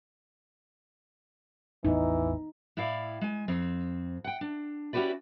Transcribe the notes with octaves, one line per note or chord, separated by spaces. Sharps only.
A1 E2 E3 B3 D#4
A2 E4 D5 F5
G#3 G#5
F2 C4
F#5 G5
D4
C#4 E4 F#4 G4 B4 D5